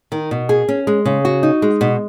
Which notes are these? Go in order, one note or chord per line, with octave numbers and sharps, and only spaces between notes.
D#3
B2
G#4
C#4
G#3
C#3
F#4
D#4
G#3
B2